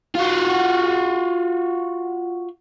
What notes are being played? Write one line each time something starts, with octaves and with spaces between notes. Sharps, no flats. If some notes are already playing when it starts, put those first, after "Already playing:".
F4 F#4